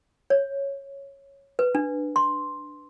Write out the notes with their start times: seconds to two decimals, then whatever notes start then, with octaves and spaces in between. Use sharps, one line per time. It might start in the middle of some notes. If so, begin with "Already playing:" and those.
0.30 C#5
1.59 B4
1.75 D4
2.16 C6